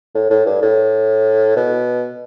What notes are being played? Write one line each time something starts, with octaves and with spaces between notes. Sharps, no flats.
A2
A2
G2
A2
B2